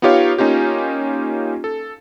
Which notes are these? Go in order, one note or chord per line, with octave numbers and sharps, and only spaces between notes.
B3 D#4 F4 G4 C#5 F5
A#3 C#4 D#4 F4 G4
A4